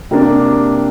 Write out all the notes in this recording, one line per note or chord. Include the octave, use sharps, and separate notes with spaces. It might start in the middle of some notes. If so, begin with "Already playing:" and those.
C3 A#3 D4 G4